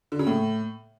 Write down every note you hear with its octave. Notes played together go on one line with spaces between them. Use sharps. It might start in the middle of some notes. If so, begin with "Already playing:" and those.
D3
C#3
A2